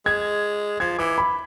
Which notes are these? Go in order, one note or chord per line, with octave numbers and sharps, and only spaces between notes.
G#3 G#6
F3 G#6
E3 D6
B5